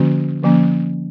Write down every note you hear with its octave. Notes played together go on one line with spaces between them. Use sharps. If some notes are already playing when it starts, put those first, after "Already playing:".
Already playing: D3 F3 A#3 C#4 F#4
D3 F3 A#3 C#4